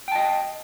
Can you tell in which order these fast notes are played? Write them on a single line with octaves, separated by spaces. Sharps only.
G5 A5 D#5